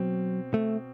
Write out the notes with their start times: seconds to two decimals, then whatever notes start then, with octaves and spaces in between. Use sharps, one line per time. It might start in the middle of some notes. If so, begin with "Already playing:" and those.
Already playing: B2 F#3 C4
0.54 A3